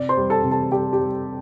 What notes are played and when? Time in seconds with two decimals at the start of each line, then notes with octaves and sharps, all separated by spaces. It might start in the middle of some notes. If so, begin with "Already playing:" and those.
Already playing: C3 D5
0.09 C5 C6
0.17 G3
0.30 A4 A5
0.43 C3
0.51 A4 A5
0.71 G3 G4 G5
0.93 G4
1.00 G3